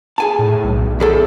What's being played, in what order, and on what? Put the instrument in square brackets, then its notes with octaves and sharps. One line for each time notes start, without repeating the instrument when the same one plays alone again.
[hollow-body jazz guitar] G#4 G#5 A5
[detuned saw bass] A2
B1
[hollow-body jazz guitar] E2 G#4 A4